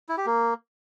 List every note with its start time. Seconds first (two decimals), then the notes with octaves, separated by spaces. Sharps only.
0.09 E4
0.18 G4
0.26 A#3